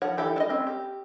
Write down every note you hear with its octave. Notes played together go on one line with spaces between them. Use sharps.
F3 C#5 F#5
E3 G4 A4 E5
D4 D#5
C4 C#4
G4